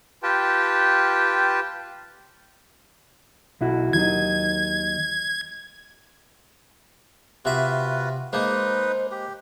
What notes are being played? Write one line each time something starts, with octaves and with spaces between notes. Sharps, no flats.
F4 G4 B4 G5 A5
B1 E4 F#4
D#2 F#3 D#4 G#6
C3 F4 F#4 B4 E5
G#3 A#3 D#4 B4 C5
G4